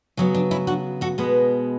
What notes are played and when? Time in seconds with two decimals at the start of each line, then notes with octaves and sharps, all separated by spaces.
0.17 C#3 F#3 B3 C#4
0.35 D4
0.51 C#4 E4
0.67 D4 F#4
1.01 F#4 A4
1.18 B2 G#3 B3